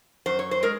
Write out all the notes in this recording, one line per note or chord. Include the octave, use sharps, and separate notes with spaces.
F#2 C5
C#5
C5
G#3 A#4